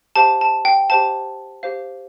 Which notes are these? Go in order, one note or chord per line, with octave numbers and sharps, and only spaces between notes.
G4 C5 F5 A5
A5
G5
G4 C5 F5 A5
G4 C5 F5